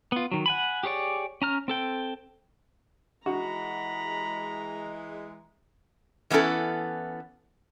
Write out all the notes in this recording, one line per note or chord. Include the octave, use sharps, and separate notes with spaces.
B3 F4
D#3 F#3
F#5 G#5 B5
G4 G#4 C#5 D5
C#4 A#5 F6
C4 A4 G5
E3 G#3 F#4 A#5 B5
E3 B3 C#4 E4 A4